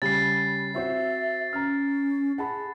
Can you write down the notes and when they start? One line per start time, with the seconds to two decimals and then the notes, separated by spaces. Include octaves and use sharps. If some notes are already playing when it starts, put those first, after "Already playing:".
0.02 C#3 G3 A6 C7
0.74 C4 F#4 C5 E5
1.53 C#4 A#5 F6
2.38 G#4 F#5 A5 B5